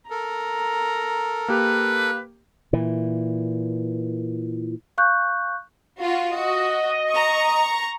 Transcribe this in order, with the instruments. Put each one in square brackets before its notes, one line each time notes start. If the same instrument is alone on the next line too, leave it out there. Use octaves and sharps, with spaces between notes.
[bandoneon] A4 A#4 [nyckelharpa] A#5
[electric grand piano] A#3 G4 [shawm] B4
[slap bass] A#2 E3
[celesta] F5 C#6 F#6 G6
[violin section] F4 F#4
[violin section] F#4 [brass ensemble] D#5
[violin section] A#5 C#6